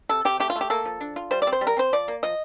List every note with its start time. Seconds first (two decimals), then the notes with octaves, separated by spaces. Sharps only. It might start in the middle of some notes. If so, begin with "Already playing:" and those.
0.09 C3 A4
0.25 C3 G4
0.40 A3 G4
0.50 F4
0.56 A3
0.61 G4
0.70 A#3 A4
0.85 F3
1.01 D4
1.16 F4
1.31 G3 C5
1.42 D5
1.47 C4
1.52 C5
1.61 G3
1.67 A#4
1.77 C4 C5
1.93 F3 D5
2.08 A#3
2.23 F3 D#5